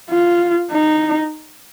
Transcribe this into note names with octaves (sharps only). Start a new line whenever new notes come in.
F4
D#4